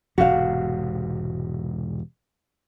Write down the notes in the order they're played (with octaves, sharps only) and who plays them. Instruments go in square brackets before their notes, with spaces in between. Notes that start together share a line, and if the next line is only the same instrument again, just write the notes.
[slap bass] E1 G#2 C3 [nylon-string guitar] F#4 F5